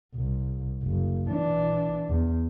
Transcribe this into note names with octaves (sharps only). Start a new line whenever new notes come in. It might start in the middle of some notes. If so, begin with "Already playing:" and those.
C2
F#1
E3 D4
E2